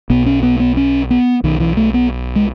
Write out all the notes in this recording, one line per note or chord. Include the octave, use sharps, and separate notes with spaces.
B1 B2 B3
C#4
B3
B3
C#4
B3
B1 B2 D#3
E3
A3
B3
G#3